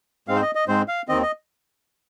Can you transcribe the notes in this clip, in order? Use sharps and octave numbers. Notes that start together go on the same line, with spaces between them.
G#2 G#3 C4 F5
C5
D#5
D#5
G#2 G#3 C4 C5
F5
D#2 D#3 C4 D#5
D#5